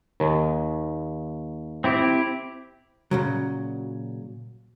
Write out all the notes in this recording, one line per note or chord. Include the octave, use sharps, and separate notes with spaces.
D#2
C4 E4 G4
A#2 C#3 F#3